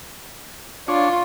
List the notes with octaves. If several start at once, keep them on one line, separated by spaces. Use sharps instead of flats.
D4 F4 C#5